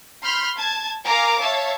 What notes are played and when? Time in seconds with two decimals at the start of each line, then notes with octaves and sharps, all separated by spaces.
0.23 B5 C6 F6 G6
0.57 A5 G#6
1.04 A#4 F5 G#5 A#5 D6
1.41 C#5 E5 F5 A5